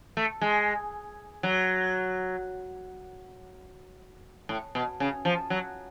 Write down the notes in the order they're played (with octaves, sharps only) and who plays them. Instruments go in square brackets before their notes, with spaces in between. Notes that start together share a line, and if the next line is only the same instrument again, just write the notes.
[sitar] A3
G#3
F#3
A2
B2
C#3
F3
F#3